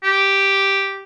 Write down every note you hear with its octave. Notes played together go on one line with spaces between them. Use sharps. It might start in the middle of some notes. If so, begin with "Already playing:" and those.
G4